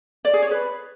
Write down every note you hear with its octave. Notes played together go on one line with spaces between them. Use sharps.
D5
G#4
C#5
B4